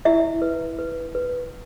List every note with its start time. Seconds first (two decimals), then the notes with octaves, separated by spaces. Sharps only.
0.05 E4 E5
0.42 B4
0.78 B4
1.15 B4